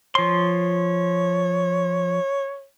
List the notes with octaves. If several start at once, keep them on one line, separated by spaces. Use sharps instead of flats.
F3 C#5 C6